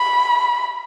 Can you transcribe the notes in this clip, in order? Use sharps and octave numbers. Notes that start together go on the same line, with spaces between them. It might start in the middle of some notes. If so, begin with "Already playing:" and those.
Already playing: B5